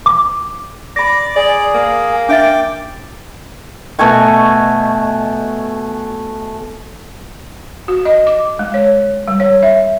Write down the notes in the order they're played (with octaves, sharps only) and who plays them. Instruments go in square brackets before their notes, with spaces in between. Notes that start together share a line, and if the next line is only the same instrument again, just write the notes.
[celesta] D6
[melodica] D5 D6 [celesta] B5 A#6
[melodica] G#4 [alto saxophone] D5
[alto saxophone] A#3
[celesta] D4 E5 A6 [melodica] G5 D6
[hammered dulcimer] B2 A3 G#5 C#6
[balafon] F#4
D#5
D6
G#3
C#5
G3
C#5
E5